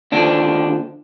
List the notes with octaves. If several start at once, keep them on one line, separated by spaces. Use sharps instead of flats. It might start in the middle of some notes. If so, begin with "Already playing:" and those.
D#2 D3 F3 D4